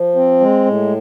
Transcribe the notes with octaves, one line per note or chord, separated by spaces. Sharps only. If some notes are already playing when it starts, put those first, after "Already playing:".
Already playing: F3
C4
G#3
A2